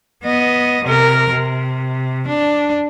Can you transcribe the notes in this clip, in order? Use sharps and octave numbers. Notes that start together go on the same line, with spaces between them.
B3 D#5
C3 A#4
C3
D4